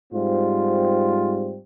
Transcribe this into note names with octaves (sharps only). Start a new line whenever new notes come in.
G#2 G3 C4 F4